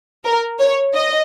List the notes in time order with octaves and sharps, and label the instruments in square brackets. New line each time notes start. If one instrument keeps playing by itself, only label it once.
[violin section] A#4
C#5
D#5